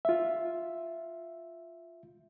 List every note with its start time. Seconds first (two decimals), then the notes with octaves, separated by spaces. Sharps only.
0.05 F4 E5